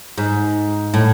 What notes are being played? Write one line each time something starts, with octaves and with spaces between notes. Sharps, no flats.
G#2
A2